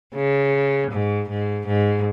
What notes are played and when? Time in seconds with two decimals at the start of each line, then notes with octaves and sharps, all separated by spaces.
0.15 C#3
0.91 G#2
1.29 G#2
1.67 G#2